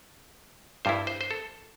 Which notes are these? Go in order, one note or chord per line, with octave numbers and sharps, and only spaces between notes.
G2 G3 E4 C5
C5
C5
A4